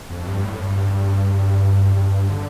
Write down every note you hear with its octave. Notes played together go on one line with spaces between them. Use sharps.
F2
G2
A2
G2
G2
D3